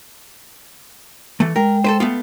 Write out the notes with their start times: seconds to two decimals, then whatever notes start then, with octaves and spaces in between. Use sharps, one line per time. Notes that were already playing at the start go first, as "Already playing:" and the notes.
1.40 E3 A3
1.56 G#3 A#4 G5
1.84 A4 B4 C5
2.00 A3 B3 F4